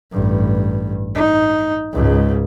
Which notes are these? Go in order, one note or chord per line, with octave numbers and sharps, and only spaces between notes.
A1 G2
D#4
C#2 G#2